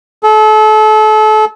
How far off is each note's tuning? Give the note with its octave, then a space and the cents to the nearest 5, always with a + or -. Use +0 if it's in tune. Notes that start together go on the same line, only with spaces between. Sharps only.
A4 -35